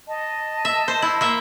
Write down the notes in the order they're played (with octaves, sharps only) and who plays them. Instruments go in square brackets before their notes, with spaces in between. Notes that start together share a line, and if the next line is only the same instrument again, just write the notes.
[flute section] D#5 A5
[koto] E5
C5
E4
A#3 E5